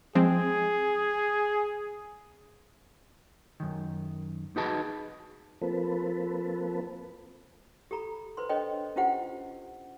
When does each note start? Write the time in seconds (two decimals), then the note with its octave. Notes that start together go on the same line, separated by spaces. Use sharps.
0.15 F3 G#3 C4 G#4
3.60 F#2 D#3
4.56 D#4 F#4 G#4 B4 D#5 A5
5.61 F3 A#3 C4 A4 B4
7.91 G4 A4 A#5 B5
8.37 B4 C5 C6
8.49 D4 A4 C5 C#5 D#5 G5
8.96 C#4 E4 F4 G4 C5 F#5